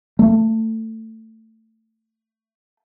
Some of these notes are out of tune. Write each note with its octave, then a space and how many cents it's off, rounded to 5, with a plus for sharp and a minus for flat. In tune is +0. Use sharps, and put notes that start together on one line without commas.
A3 +20